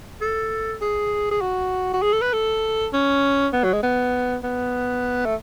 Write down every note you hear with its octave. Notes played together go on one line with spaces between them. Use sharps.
A4
G#4
G#4
F#4
F#4
G#4
A4
B4
A4
C#4
B3
F#3
G#3
B3
B3
A3